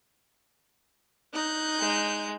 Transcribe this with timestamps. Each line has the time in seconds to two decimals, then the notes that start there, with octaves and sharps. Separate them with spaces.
1.33 D#4 F#6 G6
1.80 G#3